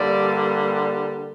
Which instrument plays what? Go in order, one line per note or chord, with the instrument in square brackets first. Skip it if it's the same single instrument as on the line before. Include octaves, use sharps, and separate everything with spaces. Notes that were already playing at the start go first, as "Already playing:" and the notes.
Already playing: [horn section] G2 D3 G3 A#3 D5